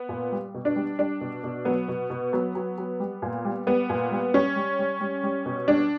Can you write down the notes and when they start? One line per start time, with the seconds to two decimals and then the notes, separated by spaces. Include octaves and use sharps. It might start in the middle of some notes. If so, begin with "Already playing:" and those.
Already playing: B3
0.09 A#2
0.32 G3
0.54 B2
0.65 D4
0.76 G3
0.99 G3 D4
1.21 B2
1.44 B2
1.65 F#3 B3
1.88 B2
2.10 B2
2.33 F#3 B3
2.55 F#3
2.78 F#3
3.00 G3
3.22 A#2
3.45 G3
3.67 G3 B3
3.90 A#2
4.11 G3
4.34 G3 C#4
4.56 G3
4.79 G3
5.01 G3
5.23 G3
5.46 B2
5.68 G3 D4